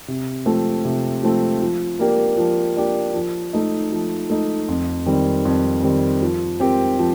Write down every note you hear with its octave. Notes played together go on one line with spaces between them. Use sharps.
C3
F3 A3 C4
C3
F3 A3 C4
F3
A#3 D4 G4 A#4
F3
A#3 D4 G4 A#4
F3
A3 D#4
F3
A3 D#4
F2
D#3 G3 C4
F2
D#3 G3 C4
F3
C4 G4 A#4
F3